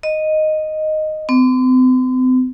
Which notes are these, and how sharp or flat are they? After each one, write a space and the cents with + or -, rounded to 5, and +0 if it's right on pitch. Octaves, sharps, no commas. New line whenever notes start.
D#5 -5
C4 -40